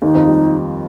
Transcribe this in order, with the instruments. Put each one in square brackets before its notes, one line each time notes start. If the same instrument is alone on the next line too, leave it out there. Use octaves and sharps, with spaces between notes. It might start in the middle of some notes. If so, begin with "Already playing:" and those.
[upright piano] D#2 D#3 [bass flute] D#4
[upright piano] F2 F3
G3